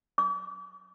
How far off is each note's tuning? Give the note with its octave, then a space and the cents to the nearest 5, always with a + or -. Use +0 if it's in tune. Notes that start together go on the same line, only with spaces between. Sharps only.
D6 -40